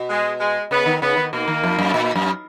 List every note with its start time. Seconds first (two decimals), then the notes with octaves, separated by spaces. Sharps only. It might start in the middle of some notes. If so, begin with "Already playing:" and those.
Already playing: B2
0.10 G#3
0.41 G#3
0.71 C#3 B3
0.86 D#3
1.02 C#3 B3
1.17 D#3
1.33 B2 A#3
1.48 D#3
1.63 F2
1.79 F#2
1.94 A#2
2.16 F#2